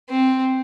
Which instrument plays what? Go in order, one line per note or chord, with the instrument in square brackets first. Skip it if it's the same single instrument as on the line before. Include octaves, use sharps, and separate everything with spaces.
[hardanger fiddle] C4